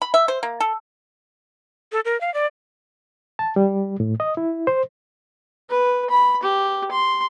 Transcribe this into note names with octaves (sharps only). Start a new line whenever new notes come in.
B5
E5
C5
A#3
A4
A4
A#4
F5
D5
A5
G3
A2
D#5
E4
C5
B4
B5
G4
C6